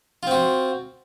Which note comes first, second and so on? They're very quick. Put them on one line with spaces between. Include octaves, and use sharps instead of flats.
F4 C4 F#4